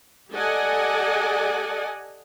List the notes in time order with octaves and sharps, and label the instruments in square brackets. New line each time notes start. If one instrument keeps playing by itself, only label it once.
[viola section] G4 A4 D5 D#5 F#5 G#5